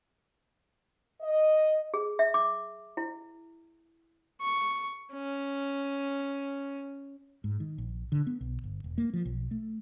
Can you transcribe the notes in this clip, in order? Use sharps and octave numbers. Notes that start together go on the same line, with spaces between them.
D#5
G#4
E5
D6
E4
C#6
C#4
G#2
D#3
A#1
D3
B3
B1
G1
E1
A#3
F3
B1
A3